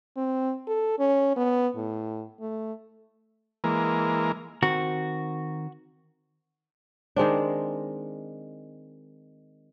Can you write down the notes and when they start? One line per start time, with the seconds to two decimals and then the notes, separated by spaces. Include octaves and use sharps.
0.17 C4
0.67 A4
0.99 C#4
1.37 B3
1.76 A2
2.41 A3
3.64 E3 G#3 A#3 A#4
4.63 D#3 C4 F#4 A#4
7.16 D#3 G#3 C4 D4